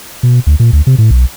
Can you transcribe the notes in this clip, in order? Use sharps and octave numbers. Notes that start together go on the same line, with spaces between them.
B2
D2
A#2
D2
C3
A2
B1